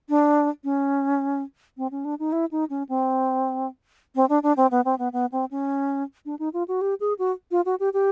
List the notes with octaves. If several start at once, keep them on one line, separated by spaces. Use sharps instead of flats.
D4
C#4
C4
C#4
D4
D#4
E4
D#4
C#4
C4
C4
D4
D4
C4
B3
C4
B3
B3
C4
C#4
D4
D#4
F4
F#4
G4
G#4
F#4
F4
F#4
G4
G4